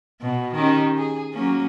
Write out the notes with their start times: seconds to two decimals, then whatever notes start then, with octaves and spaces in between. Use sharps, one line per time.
0.21 B2
0.54 D#3 C#4 G4
0.96 G#4
1.33 F#3 A#3 C#4